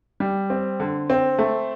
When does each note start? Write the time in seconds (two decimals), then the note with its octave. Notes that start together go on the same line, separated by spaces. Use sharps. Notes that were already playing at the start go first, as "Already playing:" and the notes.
0.20 G3
0.50 C4
0.80 D3
1.10 C4
1.39 A3